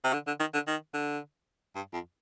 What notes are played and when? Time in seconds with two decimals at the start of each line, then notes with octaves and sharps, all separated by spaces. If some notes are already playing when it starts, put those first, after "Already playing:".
0.04 C3
0.13 D3
0.27 D3
0.40 D#3
0.54 D3
0.68 D#3
0.94 D3
1.75 G2
1.93 F2